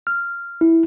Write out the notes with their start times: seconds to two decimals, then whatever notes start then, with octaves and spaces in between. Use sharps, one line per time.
0.07 F6
0.61 E4